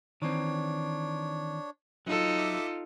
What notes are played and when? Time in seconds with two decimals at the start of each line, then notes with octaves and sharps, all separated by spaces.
0.22 D#3 E3 C4 D4 C#5
2.07 F#3 D#4 F4 A4
2.38 E5 D6